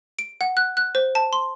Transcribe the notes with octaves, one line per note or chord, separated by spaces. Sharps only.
D7
F#5
F#6
F#6
C5
A5
C6